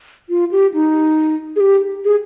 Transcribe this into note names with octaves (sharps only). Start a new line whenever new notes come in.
F4
G4
D#4
G#4
G4
G#4